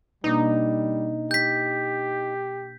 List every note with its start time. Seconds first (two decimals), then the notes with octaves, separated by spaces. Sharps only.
0.24 B2 G3 A#3 D4 D#4
1.31 G4 G6 B6